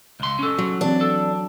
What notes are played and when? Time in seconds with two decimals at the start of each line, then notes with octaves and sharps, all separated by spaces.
0.20 C#2 C6
0.39 C#4 A4 C#6
0.59 F#3
0.81 E3 C4 D4
1.01 A4